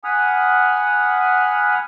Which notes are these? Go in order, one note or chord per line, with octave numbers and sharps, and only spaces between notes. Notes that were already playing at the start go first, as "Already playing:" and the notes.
F#5 G#5 B5 D#6 F6